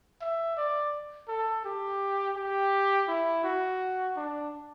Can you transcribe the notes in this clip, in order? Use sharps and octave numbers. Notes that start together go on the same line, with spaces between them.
E5
D5
A4
G4
G4
E4
F#4
D4